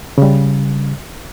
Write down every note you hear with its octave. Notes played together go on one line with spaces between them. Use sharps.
C#3 G3